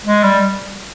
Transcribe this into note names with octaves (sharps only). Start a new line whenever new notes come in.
G#3
G3